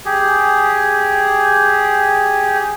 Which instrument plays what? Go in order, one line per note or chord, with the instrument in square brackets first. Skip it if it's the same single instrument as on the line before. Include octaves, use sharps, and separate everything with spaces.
[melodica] G4 G#4